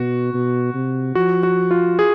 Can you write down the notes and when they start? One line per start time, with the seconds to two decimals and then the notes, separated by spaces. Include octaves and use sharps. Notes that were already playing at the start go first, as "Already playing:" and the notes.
Already playing: B2 F#4
0.34 B2
0.74 C3
1.15 F3 F#4
1.43 F#4
1.71 F4
1.99 G#4